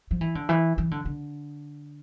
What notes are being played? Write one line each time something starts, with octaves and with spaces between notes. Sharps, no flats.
F3
E3
D3
E3
E3
D3
D3